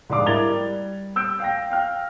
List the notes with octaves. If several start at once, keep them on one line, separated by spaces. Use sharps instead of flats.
G#2 G3 D4 F5 D6
E4 A#4 G#6 A6 F7 G7
G3
E6 G6 D7
F5 G5 A#6
F5 G5 F6